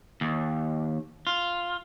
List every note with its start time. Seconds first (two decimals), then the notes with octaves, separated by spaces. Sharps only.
0.21 D#2
1.27 F4